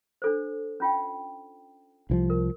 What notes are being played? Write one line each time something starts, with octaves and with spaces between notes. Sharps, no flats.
D4 A4 C5
C#4 F4 G5
C2 E3 F3
A#4